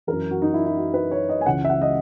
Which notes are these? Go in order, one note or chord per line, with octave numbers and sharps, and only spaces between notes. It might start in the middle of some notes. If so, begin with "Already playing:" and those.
F#2 E3 A#4
F#4
D#4
E4
E4
F#4
B4
C#5
D#5
G#5
C#2 C#3 E3 F#5
E5
F#5
D#5